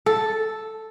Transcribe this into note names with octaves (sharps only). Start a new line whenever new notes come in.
A4